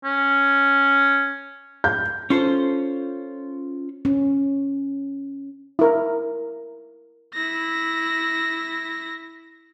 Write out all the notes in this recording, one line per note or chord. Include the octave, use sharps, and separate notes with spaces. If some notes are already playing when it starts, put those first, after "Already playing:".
C#4
G6
C#4 F4 A4 C5
C#4
E4 A#4
E4 A#6